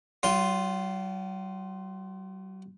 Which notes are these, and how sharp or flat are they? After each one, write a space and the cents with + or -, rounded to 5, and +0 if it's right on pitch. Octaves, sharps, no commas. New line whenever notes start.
F#3 +45 F4 +0 C6 +0